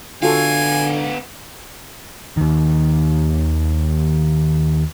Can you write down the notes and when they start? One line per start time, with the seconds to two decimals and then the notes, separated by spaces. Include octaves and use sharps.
0.23 D3 B3 F4 F#4 A4 F5 G#5
2.37 D#2 D#3